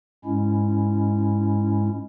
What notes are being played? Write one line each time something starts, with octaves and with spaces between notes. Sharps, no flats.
G#2 G#3 C#4 E4